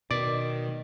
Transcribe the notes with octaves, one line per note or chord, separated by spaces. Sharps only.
B2 D#3 D5